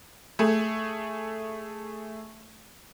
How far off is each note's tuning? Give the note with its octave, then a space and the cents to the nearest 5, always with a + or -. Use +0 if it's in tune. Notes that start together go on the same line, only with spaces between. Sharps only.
A3 +0 G#4 +0